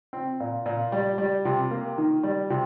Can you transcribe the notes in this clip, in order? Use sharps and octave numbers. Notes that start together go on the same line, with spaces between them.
C4
A#2
A#2
G3
G3
C3
A#3
D#3
G3
C3